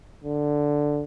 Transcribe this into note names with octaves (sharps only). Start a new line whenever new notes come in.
D3